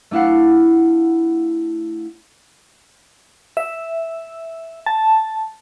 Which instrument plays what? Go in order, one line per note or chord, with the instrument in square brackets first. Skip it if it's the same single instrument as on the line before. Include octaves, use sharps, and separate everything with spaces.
[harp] A3 D4 E4 F5 F#5
[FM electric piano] E5
A5